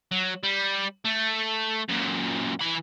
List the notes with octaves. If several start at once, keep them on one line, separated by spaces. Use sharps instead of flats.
F#3
G3
A3
F#2 A#2
E3 B5